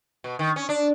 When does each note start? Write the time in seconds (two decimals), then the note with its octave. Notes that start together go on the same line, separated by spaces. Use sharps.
0.24 B2
0.39 D#3
0.56 C#4
0.69 D4